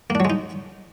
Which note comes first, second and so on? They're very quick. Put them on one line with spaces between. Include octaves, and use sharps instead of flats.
A#3 D4 F#3 G#3 D#4